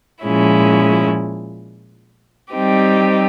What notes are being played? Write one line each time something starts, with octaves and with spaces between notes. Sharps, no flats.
A#2 F3 G#3 C#4 E4
G3 C4 D#4 G4